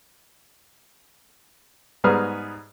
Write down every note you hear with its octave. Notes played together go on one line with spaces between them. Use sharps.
G#2 G3 B3 G#4 A#5 F6